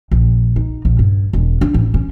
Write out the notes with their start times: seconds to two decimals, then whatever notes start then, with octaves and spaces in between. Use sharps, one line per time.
0.11 A#1
0.56 D#4
0.85 A#1
0.99 G2
1.33 E1
1.61 D4
1.74 A1
1.94 C#4